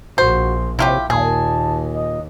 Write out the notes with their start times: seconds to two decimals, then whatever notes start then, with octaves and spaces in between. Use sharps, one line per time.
0.18 A#1 F#4 C5
0.79 C3 E4 F4 G4 C#5
1.10 D#2 A#2 G#4 A5
1.95 D#5